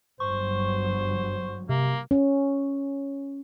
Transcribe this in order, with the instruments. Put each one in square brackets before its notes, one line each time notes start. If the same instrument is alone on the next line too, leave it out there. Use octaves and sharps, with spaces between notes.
[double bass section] G1 G2 F#3 [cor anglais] C5 [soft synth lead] C#6
[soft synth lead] C3 [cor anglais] A#3
[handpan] C#4